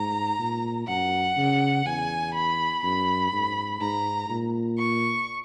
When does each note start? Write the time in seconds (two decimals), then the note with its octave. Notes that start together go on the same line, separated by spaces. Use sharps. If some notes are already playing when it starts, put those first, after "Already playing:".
Already playing: G#2 A#5
0.39 A#2
0.88 F#2 F#5
1.37 C#3
1.85 E2 G#5
2.34 B5
2.83 F#2 B5
3.32 G#2
3.81 G#2 A#5
4.29 A#2
4.78 C#6